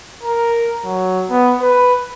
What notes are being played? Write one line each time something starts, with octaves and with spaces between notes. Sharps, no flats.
A#4
F#3
B3
B4